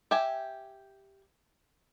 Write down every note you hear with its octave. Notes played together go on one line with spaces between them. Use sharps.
G4 E5 G#5